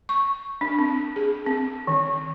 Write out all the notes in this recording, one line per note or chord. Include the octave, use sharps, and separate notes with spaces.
C#6
D4
C4
G#4
C4
D#3